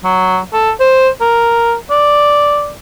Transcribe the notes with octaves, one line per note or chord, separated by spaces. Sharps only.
F#3
A4
C5
A#4
D5